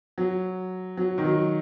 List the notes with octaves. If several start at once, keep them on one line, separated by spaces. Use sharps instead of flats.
F#3
F#3
D#3
F#3